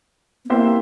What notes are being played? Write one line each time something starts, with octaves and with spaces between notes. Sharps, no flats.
B3
A#3 C4 E4 G4 C5 E5